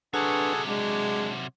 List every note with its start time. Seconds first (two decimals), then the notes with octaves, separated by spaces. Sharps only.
0.14 C3 F#3 D4 G#4 A4 B4 F#5 C#6
0.67 G#3 D4 F#5